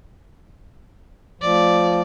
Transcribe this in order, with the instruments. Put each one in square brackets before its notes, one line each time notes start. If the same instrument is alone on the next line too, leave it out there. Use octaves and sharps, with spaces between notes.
[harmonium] F3 [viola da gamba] A3 D5